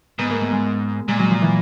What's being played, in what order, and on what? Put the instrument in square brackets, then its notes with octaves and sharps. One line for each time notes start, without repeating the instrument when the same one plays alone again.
[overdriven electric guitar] G#2 [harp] B3
[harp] A#3
A3
G#3
[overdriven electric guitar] A#2 [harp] G#3
[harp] F#3
F3
E3